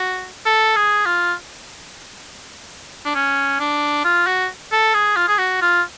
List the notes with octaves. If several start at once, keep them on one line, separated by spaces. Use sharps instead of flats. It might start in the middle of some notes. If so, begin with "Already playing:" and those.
Already playing: F#4
A4
G#4
F4
D4
C#4
D4
F4
F#4
A4
G#4
F4
G#4
F#4
F4